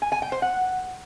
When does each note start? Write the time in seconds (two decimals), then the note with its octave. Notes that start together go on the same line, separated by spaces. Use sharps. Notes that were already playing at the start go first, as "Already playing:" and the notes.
0.02 G#5
0.12 G#5
0.22 G5
0.32 C5
0.42 F#5